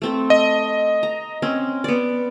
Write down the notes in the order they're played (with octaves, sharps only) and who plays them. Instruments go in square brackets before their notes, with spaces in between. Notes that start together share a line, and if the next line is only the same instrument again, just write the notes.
[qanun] A3 C4 A4
[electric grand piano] D#5
[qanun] A#5
C4 C#4
B3 D5